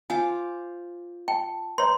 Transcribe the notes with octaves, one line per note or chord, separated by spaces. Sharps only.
F4 C5 G#5 D6
G5 A5
B4 C#5 A#5 C6